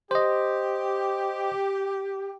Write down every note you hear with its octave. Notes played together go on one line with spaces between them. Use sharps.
G4 C5 D#5